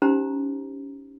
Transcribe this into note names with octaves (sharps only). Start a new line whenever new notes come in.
C#4 D#4 G4 C5 A#5